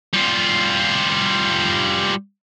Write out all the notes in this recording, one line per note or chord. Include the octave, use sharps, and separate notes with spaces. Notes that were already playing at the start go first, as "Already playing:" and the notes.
G3 F4